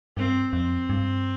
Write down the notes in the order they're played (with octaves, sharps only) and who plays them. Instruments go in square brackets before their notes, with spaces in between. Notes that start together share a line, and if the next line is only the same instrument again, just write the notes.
[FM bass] G2 [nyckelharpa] C4
[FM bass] F2 [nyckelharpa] C4
[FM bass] G2